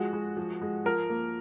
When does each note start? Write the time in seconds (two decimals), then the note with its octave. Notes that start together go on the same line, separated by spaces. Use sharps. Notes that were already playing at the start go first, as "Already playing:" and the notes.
Already playing: F3 G#3 F#4
0.13 G#3
0.37 F3
0.62 G#3
0.85 F3 A#4
1.10 A#3